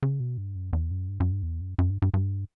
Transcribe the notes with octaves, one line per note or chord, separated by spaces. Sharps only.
C#3
B2
G2
F#2
E2
F#2
G2
F#2
G2
E2
F#2
F#2
G2
G2
G2